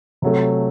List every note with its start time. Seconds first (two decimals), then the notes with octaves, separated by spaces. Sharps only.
0.22 C3 F#3 A3